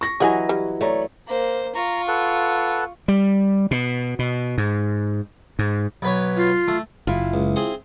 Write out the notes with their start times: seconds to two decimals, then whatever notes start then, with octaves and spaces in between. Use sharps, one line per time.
0.01 C#6 A#6
0.20 E3 F#3 G4 D#5 F#5 G#5
0.49 G3
0.81 A3 C#5 D5 A#5
1.27 A#3 C5
1.75 F4 A#5 C#6
2.08 A4 B4 F#5
3.08 G3
3.71 B2
4.19 B2
4.58 G#2
5.59 G#2
6.02 B1 B4 C#5
6.37 F4
6.68 A3
7.07 F#1 E4 F4
7.34 C#2
7.56 C4 G#4